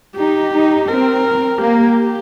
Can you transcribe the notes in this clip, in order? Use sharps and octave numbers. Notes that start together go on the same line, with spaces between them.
D#4 G4
D#4
C4 A#4
A#3 G4